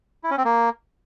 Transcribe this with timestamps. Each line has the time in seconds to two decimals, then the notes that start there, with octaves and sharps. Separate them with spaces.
0.24 E4
0.31 C#4
0.38 C4
0.45 A#3